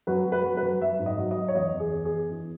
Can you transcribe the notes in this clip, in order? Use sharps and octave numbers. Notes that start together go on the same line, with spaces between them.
F#3 B4
F#3
B4
F#3
B4
F#3
F#3 E5
G#2
D#5
F#3
D#5
F#3
C#5
E2 D#5
E2
G#4
E2
G#4
E2
E3